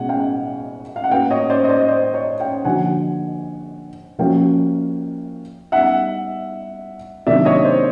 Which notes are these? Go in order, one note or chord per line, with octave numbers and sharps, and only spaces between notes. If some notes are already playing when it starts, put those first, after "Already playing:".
Already playing: B2 G#3 C#4 F#5 G#5
F5 G5
F5
F#5
A#3 C#4 F#4 B4 F5 G5
C#5 D#5
C5 D5
D#5
C5 D5
D#5
C5 D5
C#5 D#5
F5 G5
D3 F3 A#3 D4 F#4 F#5 G#5
F3 A#3 C#4 F#4 F5 G5
G3 B3 D#4 E5 F#5
C3 D#3 F#3 A#3 D4 D5 E5
C#5 D#5
C5 D5